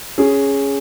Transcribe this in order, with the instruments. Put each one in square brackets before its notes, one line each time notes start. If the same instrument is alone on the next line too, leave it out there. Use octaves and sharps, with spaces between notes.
[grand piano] C#4 G#4